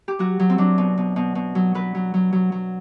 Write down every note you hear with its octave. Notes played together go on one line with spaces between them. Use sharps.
G4
F#3 F#4
F#3
C4
F#3 D4
B2
B2
B2
B2
F#3
F#3 B4
F#3
F#3
F#3
F#3